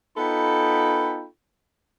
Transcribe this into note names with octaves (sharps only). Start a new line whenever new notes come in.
B3 D#4 F4 A4 G5 B5